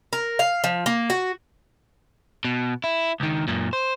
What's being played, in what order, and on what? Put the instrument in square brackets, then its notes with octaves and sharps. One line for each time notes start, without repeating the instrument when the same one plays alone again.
[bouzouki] A#4
F5
F3
A#3
F#4
[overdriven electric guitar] B2
E4
C#2 D#3
F#2 A#2
C5